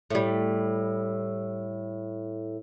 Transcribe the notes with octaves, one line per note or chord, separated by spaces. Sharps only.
A2 G3